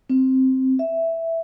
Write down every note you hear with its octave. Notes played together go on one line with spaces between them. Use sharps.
C4
E5